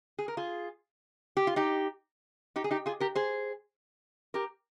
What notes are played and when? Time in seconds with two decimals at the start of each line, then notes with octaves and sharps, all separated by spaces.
0.19 G#4
0.28 A#4
0.37 F4 G#4
1.37 G4
1.47 F4
1.56 D#4 G4
2.56 D#4 G4
2.64 G#4
2.71 D#4 G4
2.86 F4 G#4
3.00 G4 A#4
3.15 G#4 C5
4.34 G4 A#4